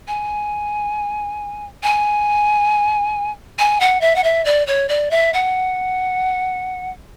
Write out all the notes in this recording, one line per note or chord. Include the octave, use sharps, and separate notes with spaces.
G#5
G#5
G#5
F#5
E5
F#5
E5
D5
C#5
D5
E5
F#5